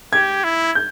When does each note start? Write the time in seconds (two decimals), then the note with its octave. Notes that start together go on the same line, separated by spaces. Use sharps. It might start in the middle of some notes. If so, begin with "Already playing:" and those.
0.13 G4 G#6
0.44 E4
0.75 G6